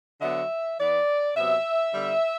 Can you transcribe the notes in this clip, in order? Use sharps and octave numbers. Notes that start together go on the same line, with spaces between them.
D3 F#3 B3 E5
E3 B3 D5
C3 F#3 B3 E5
D3 G3 B3